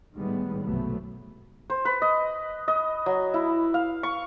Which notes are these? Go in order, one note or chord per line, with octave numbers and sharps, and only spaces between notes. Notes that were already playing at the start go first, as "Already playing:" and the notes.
A2 D#3 G3 G#3 B3
B1 F#2 C3 F#3 A3 B3
C5
B4
D#5
D#5
F#3
E4
F5
C#6